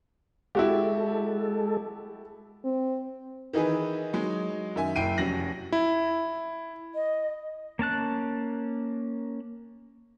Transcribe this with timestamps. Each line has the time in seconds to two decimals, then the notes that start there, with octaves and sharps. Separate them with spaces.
0.55 G#3 E4 F#4 G4 A4
2.64 C4
3.53 D#3 E3 D#4 G#4 B4
4.13 F#3 G#3 D#4
4.76 F#2 D#3 E5 G#5
4.96 F#1 E4 G5 C7 D7 D#7
5.18 F1 C#4 F#4 A#6 F#7
5.72 E4
6.93 D#5
7.79 A#3 C#4 A5 F#6